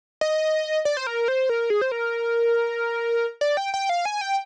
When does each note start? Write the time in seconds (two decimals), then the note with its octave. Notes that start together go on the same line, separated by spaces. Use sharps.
0.21 D#5
0.85 D5
0.97 C5
1.07 A#4
1.28 C5
1.49 A#4
1.70 G#4
1.81 C5
1.92 A#4
3.41 D5
3.57 G5
3.74 G5
3.89 F5
4.05 G#5
4.21 G5